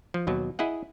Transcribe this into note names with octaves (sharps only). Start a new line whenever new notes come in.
F3
D#2 B2 F#3
E4 G#4 D#5 F#5